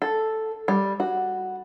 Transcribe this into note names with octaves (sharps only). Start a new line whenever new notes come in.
A4
G3
F#4